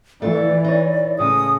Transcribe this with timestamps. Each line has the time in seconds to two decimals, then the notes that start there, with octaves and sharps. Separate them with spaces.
0.22 E3 A3 F4 D5
0.64 D#4 C#5
1.19 A2 C#3 G#3 D#6